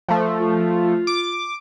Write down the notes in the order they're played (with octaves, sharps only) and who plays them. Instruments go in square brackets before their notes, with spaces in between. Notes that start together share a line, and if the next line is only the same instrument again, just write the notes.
[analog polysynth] F3 A3
[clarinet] F4
[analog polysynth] D6